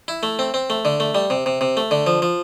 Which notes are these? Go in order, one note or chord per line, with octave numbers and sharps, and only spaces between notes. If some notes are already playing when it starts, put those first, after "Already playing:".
E4
A3
C4
C4
A3
D3
A3
G3
C3
C3
C3
A3
D3
F3
F3